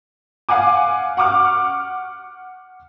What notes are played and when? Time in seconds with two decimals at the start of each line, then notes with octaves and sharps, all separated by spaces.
0.49 F5 F#5 G#5 D6
1.17 F#5 C#6 D6 F6